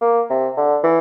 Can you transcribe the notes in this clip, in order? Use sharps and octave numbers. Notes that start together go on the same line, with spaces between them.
A#3
C3
D3
E3